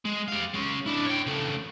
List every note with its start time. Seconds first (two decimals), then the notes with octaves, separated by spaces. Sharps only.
0.05 G#3
0.28 G4 F5
0.54 G#3 C#4
0.86 D4 E4
1.06 C#5 G5
1.27 C#3 A3